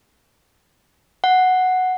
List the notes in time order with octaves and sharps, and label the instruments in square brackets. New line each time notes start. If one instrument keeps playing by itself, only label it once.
[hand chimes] F#5